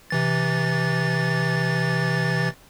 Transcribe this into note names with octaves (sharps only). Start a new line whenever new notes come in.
C3 E3 A6